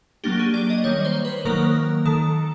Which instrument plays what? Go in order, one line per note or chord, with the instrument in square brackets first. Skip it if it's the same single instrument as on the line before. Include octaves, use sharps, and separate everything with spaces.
[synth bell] F#3 A#3 D4 G4
G#4
D5
D#5
D#3 G3 A#3 C#5
C#5
C5
B4
D#3 F#3 A#3 A#4
D#3 A4